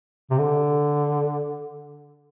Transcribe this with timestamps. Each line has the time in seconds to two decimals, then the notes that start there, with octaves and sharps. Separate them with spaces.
0.30 C3
0.38 D3